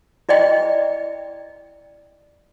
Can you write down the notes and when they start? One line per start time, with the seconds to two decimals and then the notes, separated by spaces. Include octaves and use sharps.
0.29 E4 D5 D#5 G5